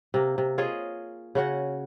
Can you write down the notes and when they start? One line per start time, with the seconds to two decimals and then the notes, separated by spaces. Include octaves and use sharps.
0.14 C3 A#3
0.38 C3
0.58 F4 G#4 C#5 D#5
1.35 C#3 C#4 F#4 F#5